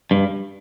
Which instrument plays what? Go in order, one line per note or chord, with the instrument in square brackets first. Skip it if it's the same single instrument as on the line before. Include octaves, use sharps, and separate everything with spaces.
[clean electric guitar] G2